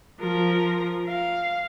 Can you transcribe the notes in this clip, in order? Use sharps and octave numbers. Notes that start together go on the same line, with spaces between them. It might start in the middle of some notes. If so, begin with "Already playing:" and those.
F3 A#4
F5